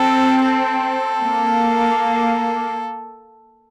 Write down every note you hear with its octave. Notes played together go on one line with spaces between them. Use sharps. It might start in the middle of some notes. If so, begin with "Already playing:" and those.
Already playing: C4 A4
A4
A#3